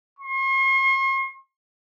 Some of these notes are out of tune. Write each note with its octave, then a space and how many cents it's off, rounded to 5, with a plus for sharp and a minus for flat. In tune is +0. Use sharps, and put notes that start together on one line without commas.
C6 +45